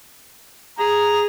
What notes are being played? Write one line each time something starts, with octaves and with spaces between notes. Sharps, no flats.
G#4 A#5